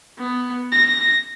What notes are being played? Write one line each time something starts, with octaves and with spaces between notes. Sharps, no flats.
B3
A#6